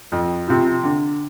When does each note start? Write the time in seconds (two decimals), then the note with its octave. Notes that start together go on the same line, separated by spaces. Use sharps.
0.12 F2
0.48 C3 F3
0.84 D3